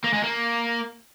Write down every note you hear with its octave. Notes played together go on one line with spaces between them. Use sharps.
A#3
G#3
A#3